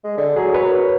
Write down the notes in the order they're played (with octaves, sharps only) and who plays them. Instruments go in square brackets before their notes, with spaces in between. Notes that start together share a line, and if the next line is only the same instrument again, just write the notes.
[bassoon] G#3
D3
[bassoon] F#3 [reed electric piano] G#4
[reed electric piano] A#4 B4 C#5